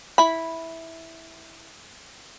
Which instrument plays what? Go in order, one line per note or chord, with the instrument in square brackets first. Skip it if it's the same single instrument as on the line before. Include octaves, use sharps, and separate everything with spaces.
[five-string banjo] E4 B5